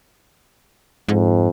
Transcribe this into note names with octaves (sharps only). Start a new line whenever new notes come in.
F2 G#2